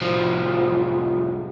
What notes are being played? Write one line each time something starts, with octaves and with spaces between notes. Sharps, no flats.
C2 F3